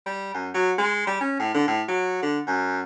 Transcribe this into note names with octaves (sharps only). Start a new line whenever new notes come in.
G3
F#2
F#3
G#3
G3
C#4
A2
D3
A2
F#3
D3
F#2